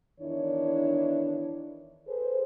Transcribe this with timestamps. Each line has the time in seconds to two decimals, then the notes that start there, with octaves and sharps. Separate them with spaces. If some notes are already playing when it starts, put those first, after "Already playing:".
0.20 E2 D#3 D4 E4 C#5
2.07 G#4 A4 B4 C5